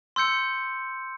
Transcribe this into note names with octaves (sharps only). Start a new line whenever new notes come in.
C6 E6 G6 C#7